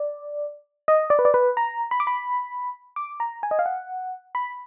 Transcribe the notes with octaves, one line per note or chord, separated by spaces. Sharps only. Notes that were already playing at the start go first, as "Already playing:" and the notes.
Already playing: D5
D#5
D5
B4
D5
B4
A#5
B5
D6
B5
D6
A#5
G#5
D#5
F5
F#5
B5